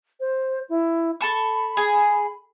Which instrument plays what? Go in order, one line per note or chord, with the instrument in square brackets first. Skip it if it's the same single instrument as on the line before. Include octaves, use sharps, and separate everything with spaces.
[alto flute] C5
E4
[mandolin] A4 A5 C#6 [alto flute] B5
[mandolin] G#4